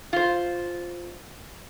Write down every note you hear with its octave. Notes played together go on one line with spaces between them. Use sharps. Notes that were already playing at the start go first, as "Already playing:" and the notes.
F4 C5